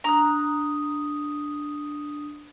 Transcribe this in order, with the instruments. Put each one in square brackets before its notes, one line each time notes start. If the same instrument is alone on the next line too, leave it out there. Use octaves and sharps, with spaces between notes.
[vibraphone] D4 D#6 [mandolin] A#5 F#6